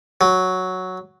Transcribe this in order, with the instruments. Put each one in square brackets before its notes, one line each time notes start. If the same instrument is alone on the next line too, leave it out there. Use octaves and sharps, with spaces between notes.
[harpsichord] F#3